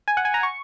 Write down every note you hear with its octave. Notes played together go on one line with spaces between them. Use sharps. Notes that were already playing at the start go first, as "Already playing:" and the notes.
G#5
F#5
G#5
A#5
C#6